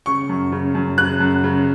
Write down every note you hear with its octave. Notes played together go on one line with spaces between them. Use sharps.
C#3 C#6
F#2
C#3
F#2
C#3 F#6
F#2
C#3